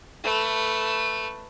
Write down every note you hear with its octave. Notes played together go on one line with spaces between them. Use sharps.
A3 B4